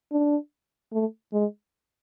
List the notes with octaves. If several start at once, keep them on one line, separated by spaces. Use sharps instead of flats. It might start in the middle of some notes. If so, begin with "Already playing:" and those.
D4
A3
G#3